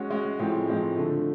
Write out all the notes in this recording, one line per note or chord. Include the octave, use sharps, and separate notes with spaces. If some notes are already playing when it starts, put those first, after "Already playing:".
Already playing: G#3 C#4 F#4
G#3 C#4 F#4
A2 F3 G#3 C4
A2 F3 G#3 C4
D3 F3 A3